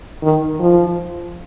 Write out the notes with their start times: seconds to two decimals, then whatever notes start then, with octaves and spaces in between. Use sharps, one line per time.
0.22 D#3
0.60 F3